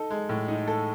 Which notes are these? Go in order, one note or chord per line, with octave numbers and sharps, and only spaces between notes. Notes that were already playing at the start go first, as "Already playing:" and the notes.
Already playing: D#4 A4
G#3
A2
D#4
A4